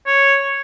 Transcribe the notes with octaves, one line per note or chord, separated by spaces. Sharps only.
C#5